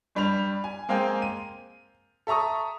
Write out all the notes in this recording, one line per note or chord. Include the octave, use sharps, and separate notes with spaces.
G2 G3 B5 F7
G#5
G#3 A#3 C4 F5 G5 G#5
D#7
A4 E5 A#5 C#6 D#6